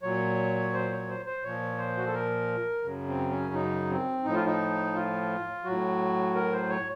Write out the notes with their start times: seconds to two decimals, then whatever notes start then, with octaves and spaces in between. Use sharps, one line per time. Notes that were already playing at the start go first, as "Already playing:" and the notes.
0.03 A#2 F#3 C#5
0.73 C5
0.91 C#5
1.09 C5
1.26 C5
1.44 A#2 F3 C#5
1.78 C5
1.97 F#4
2.06 A4
2.13 A#4
2.84 F#2 C#3 F#3
3.08 C4
3.30 C#4
3.54 D#4
3.90 C4
4.24 A2 F3 D#4
4.35 F4
4.46 D#4
4.95 F4
5.64 A2 F#3 F#4
6.35 A#4
6.52 C5
6.69 C#5